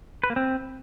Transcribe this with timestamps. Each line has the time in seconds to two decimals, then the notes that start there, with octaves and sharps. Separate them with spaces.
0.24 B4
0.30 A#3
0.36 C4